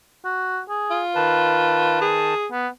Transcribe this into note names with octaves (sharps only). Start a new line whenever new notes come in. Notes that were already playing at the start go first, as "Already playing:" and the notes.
F#4
G#4
F4
D#3 B4 A5
G#4
B3